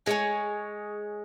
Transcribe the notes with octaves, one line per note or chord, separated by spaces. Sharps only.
G#3 G#4 C#5 G#5